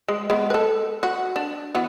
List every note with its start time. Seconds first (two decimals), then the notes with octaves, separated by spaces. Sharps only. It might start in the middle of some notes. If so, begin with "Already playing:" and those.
0.08 G#3
0.30 G#3 B3
0.50 A4 B4
1.03 F#4
1.36 D4
1.75 E3 B3 F#4